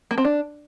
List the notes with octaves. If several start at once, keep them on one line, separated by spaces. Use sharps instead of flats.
A#3
C4
D4